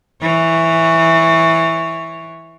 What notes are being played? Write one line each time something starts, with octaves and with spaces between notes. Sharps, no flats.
E3 C#5